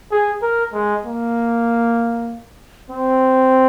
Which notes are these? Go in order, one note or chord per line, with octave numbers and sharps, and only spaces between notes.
G#4
A#4
G#3
A#3
C4